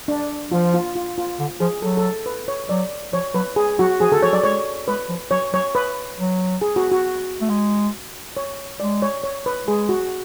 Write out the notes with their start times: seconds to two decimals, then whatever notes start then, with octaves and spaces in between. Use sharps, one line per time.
0.08 D4
0.51 F3 F4
0.74 F4
0.95 F4
1.18 F4
1.40 D3
1.60 F3 G#4
1.82 F#3 A4
1.97 A4
2.26 B4
2.48 C#5
2.69 F#3 D5
3.13 F3 C#5
3.35 F#3 B4
3.56 G#4
3.79 F#3 F#4
4.00 F3 G#4
4.12 D3 A4
4.23 F3 C#5
4.33 F#3 D5
4.44 G#3 C#5
4.88 G#3 B4
5.09 F3
5.31 F#3 C#5
5.53 F#3 C#5
5.75 B4
6.18 F#3
6.62 G#4
6.76 F#4
6.92 F#4
7.41 A3
7.50 G#3
8.37 C#5
8.80 G#3 D5
9.02 C#5
9.24 C#5
9.46 B4
9.67 G#3 G#4
9.89 F#4